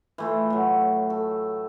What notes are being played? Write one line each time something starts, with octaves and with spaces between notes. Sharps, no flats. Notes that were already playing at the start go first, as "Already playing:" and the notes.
E3 A3 F4
A2 F#3
A4